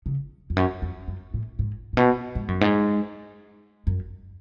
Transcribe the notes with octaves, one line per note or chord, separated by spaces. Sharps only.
C#3
F2
F#2
F2
F#2
A2
G#2
A2
B2
G#2
F#2
G#2
F#2